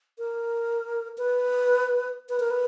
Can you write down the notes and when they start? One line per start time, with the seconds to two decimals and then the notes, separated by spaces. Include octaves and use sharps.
0.18 A#4
1.18 B4
2.29 B4
2.40 A#4
2.50 B4